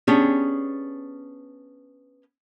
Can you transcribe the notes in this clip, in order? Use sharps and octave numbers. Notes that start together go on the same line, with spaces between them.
B3 C#4 D4 G4 G#4